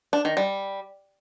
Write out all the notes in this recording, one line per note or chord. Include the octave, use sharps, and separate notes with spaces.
D4
D#3
G3